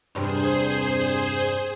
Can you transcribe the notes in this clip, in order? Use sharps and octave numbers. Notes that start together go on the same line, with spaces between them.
E2 G2 C3 G#4 C5